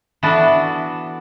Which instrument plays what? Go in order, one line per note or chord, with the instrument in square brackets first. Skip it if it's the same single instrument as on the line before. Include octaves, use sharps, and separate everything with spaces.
[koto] E3 B3 D4 F#4 A4